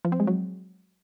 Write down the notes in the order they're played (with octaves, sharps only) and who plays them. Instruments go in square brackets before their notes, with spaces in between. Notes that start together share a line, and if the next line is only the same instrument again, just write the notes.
[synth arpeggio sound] F3
C4
G#3
F#3